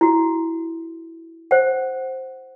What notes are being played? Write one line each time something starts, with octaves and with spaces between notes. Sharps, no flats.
E4 F#4
C5 F#5